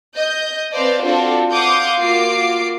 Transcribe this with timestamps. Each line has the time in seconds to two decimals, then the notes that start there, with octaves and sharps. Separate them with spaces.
0.15 D#5 G6
0.73 C4 B4 C5 D5 F5 A5
1.03 C4 D4 F4 F#4 A4
1.53 F5 F#5 C6 D6 D#6 G6
1.99 A#3 F4 F#4 D6 C7 D7